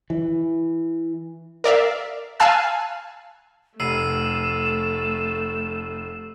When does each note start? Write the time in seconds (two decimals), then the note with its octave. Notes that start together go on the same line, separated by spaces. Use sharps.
0.10 E3
1.64 A#4 D5 E5 F5
2.40 F5 G#5 A5 E6 F#6
3.80 F1 A3 E6 C7 D#7 E7